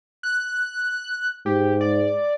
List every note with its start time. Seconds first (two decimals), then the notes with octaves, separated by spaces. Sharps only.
0.23 F#6
1.46 G#2 G4
1.81 D5